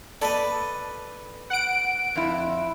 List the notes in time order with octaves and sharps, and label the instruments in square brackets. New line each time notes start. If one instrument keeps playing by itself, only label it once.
[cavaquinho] A4 B4 B5 [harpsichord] D5 D#5
[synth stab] F#5 D7
[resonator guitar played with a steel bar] F2 E4